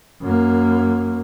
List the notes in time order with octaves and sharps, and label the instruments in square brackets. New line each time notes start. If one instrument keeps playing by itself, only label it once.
[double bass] F#2 A#3